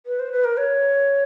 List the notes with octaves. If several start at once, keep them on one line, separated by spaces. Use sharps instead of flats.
B4
C5
B4
A#4
C#5